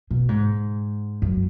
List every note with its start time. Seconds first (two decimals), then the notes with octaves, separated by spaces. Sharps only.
0.11 B2
0.29 G#2
1.22 F#2